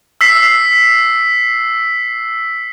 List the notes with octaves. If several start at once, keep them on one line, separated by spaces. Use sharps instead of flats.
E6 B6 C7